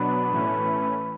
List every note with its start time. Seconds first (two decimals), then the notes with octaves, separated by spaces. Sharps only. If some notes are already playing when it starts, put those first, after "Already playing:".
Already playing: B2 F#3 B3 D4 B4
0.30 A2 E3 A3 C#4